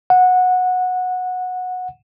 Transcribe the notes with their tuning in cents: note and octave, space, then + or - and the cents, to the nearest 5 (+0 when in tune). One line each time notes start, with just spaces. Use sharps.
F#5 -15